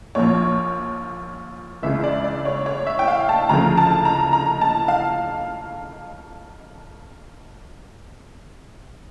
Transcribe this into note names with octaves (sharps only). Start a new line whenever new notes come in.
A#1 A#2 F3 C#5
C#2 C#3 E3 E5
D5
D5
C#5
C#5
E5
G5
F5
A5
D2 C#3 F3 A#5
A5
A#5
A#5
A5
F5